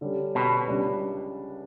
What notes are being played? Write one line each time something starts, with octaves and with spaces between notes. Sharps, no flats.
D3 G3 C#4
B2
C#2 C#3 G3 D4